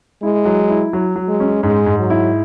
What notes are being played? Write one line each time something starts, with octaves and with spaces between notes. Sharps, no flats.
G#3 E4
F#3
E4
F#3
F#3
G#3
C#4
G#2 G#3
G#2
F#3
E4